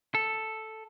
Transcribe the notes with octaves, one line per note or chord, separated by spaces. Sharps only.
A4